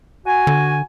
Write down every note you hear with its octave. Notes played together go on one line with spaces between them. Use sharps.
F#4 G#5
D3